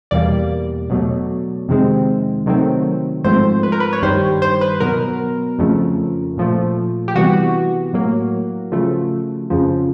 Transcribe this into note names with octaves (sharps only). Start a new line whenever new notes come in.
E2 B2 G3 A#3 D5
B2 F#3 A3
F2 C3 D#3 G#3 C4
C3 D#3 F#3 A3 C4
G#2 F3 A3 C4 C5
B4
A#4
B4
C#5
G2 D#3 G3 C5
C5
B4
B2 F#3 B3 A#4
F2 C#3 F3 A3
A#2 F3 A3
G4
C3 E3 G3 B3 F#4
A2 F#3 A#3
C#3 F3 A3
F2 C#3 F3